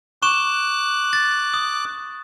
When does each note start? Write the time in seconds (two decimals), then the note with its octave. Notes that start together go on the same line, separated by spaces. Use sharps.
0.23 C#6 D6 F#6 E7
1.13 A6
1.54 D#6